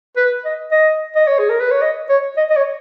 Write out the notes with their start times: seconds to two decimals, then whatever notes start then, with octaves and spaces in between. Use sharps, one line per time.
0.17 B4
0.45 D#5
0.72 D#5
1.16 D#5
1.27 C#5
1.39 G#4
1.50 A#4
1.60 B4
1.71 C#5
1.82 D#5
2.10 C#5
2.37 D#5
2.50 D#5
2.57 C#5